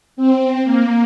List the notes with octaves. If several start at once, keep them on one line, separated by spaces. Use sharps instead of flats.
C4
A#3